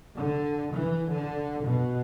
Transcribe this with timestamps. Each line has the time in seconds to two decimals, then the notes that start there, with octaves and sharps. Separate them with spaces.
0.14 D3
0.73 E3
1.10 D3
1.64 B2